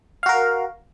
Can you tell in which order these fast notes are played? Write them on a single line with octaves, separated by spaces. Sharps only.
F5 F#4 A#4